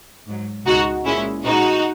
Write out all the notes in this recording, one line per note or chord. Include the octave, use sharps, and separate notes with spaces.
G#2 F#3
C#2 B2 G#3 D#4 F#4
A#2 G#3 C#4 E4
A#2 G#3 D#4 F#4